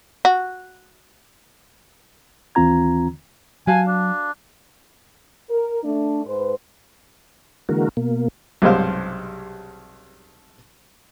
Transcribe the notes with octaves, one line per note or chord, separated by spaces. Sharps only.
F#4
D#2 E3 C4 F4 A#5 G#6
F#3 F#4 F5 G#5 A5
D4
A#4
A3 D4
G#2 B4 C5
D3 E3 G#3 A#3 F#4 A#4
B2 A#3
B1 G2 C3 G#3 C5 F5